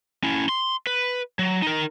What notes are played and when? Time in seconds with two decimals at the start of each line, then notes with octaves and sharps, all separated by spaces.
0.23 C#4 E4
0.49 C6
0.87 B4
1.39 F#3
1.62 D#4 A#4